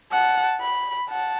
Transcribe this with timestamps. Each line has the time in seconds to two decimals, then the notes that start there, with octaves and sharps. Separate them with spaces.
0.12 F#5 A5
0.61 B5
1.10 F#5 A5